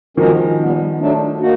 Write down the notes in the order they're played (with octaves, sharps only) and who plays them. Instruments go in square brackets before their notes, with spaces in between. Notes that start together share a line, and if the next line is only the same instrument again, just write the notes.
[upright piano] D#3 F3 [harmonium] G#3 C#4 F#4 A#4
[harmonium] A#2 G3 B3
F#3 A3 D4
A#3 D#4 F#4